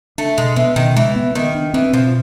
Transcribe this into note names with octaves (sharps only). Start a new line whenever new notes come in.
A3 D4
B2 G#3
E3 B3
B2 D#3
E3 G#3
B3
D#3 B3
D4
E3 C4
B2 F3